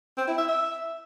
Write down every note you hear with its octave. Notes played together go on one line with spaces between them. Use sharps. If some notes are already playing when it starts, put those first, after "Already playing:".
C4
E4
E5
E5